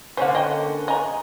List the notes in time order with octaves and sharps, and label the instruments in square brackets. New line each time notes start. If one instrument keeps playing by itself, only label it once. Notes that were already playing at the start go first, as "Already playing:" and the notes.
[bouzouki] D3 A#3 C#4 [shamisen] C5 F#5
[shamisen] D#5 G5
[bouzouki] G#4 [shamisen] D#5 A#5